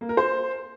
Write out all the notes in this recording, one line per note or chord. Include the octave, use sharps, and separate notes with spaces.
A#3
A#4
C5